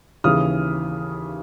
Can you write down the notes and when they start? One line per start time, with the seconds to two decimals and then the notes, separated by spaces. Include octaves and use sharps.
0.24 D#2 C#3 E3 D#6 F6